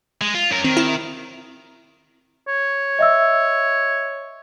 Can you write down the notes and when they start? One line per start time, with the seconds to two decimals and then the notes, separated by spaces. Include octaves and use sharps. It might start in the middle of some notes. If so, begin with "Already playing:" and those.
0.21 G#3
0.34 F4
0.51 F#2 A#4
0.65 D#3 C4
0.77 E4
2.48 C#5
2.99 D#5 E5 E6